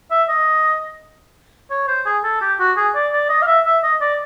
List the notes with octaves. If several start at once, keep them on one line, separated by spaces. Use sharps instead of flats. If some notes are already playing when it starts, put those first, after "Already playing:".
E5
D#5
C#5
C5
G#4
A4
G4
F#4
G#4
D5
D5
D#5
F5
E5
E5
D#5
D5